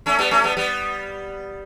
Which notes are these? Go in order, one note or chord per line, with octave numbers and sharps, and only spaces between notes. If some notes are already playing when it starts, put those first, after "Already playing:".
A3 C#4
G3 B3
A3 C#4
G3 B3
G3 B3